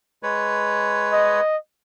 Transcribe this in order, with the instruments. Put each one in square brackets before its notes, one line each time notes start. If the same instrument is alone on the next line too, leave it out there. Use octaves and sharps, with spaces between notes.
[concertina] G#3 B4 C#5
[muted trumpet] D#5